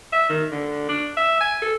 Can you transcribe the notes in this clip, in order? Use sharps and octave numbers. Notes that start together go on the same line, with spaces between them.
E5
D#3
D3
D4
E5
G#5
A4